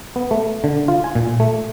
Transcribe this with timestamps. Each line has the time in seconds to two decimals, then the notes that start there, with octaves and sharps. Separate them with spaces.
0.16 B3
0.31 A3
0.64 D3
0.88 F4
1.04 G#5
1.15 A#2
1.40 A3